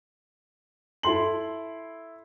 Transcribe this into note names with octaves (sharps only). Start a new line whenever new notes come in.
E4 A4 C6 F#7